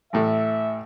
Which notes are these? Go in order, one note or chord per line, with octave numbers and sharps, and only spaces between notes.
A1 A2 A3 E5